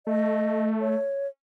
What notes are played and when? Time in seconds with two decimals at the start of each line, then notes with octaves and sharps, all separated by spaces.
0.07 A3 D#5
0.81 C#5